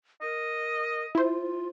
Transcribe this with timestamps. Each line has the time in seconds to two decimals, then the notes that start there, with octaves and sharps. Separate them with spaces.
0.22 A#4 D#5
1.15 E4 F4 C5